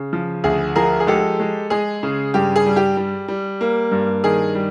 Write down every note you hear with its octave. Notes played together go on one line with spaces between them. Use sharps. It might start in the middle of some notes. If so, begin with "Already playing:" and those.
Already playing: C#3
F3
D2 G#4
F3 G#4 A#4
G#4
G#3 G4 A4
G#3
G#3 G#4
C#3
G2 G4
G#4
G3
G4
G3
G3
A#3
G2
D#3 G#4
G3